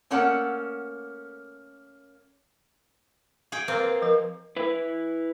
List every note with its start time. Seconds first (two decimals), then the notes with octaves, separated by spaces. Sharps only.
0.10 A3 A#3 C#4 A4 F#5
3.52 G#4 G5
3.68 A#3 C4
3.80 B4
4.02 F3 A#4
4.56 E4 B4